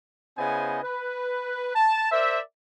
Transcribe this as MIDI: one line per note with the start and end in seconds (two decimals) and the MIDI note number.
0.38 0.80 49
0.38 0.80 59
0.38 0.80 64
0.38 0.80 72
0.38 0.80 75
0.38 0.80 80
0.83 1.75 71
1.76 2.10 81
2.12 2.40 70
2.12 2.40 72
2.12 2.40 74
2.12 2.40 76